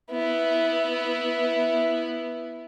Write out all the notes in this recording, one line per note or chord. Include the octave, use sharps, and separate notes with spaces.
B3 E4